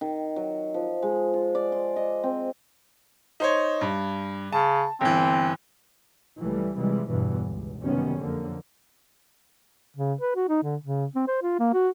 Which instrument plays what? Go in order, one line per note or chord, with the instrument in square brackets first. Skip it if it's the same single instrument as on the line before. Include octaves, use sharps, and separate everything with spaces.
[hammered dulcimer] D#3
F#3
F3
G#3
F4
D5
C6
D#5
C4
[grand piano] D#4 C5 C#5
G2
[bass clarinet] C#3 [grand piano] A5
[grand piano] G1 E3 [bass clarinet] C4
[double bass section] C#2 E3 G3 A3
C3 E3 F3 G3 G#3
G1 E2 G2 B2 E3
C#2
F#1 C3 D#3 G3 B3 C#4
F2 D3 A#3
[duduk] C#3
B4
F#4
D#4
D3
C#3
C4
C5
F4
A#3
F#4